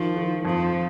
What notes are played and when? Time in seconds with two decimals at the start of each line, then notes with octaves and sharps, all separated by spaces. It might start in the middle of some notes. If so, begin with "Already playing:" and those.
Already playing: D#3 F3
0.17 D#3
0.45 F2 F3